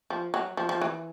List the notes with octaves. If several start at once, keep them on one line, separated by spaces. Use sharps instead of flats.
F3
F#3
F3
F3
E3